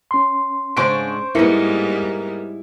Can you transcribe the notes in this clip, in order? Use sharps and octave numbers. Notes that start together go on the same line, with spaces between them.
C#4 C6
G#2 C#3 D4 C5 C#6 D7
G#2 G3 A#3 B3 E4 B4 C#7